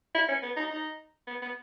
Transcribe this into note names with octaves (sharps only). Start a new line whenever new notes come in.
E4
C#4
B3
D#4
D#4
B3
B3